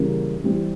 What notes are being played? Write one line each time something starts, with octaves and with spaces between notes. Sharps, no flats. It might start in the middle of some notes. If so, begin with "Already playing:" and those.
Already playing: C#3 E3 G3 A#3 C#4
E3 G3 C4 G4